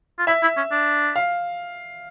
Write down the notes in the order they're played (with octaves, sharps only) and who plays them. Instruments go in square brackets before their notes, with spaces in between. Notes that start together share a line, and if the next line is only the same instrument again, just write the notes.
[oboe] F4
[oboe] E4 [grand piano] E5
[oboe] E4
C#4
D4
[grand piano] F5